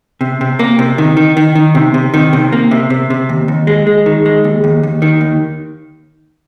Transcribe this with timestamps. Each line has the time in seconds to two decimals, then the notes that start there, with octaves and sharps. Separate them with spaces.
0.21 C3
0.41 C3
0.59 A#3
0.79 C3
0.98 D#3
1.17 D#3
1.37 D#3
1.55 D#3
1.75 C3
1.94 C3
2.14 D#3
2.33 C3
2.52 A#3
2.71 C3
2.90 C3
3.10 C3
3.29 D#2
3.48 D#2
3.67 G#3
3.87 G#3
4.06 D#3
4.26 G#3
4.44 D#2
4.64 D#2
4.83 D#2
5.02 D#3
5.21 D#2